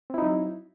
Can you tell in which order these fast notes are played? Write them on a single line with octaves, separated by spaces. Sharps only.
C4 E4 D#4 F#3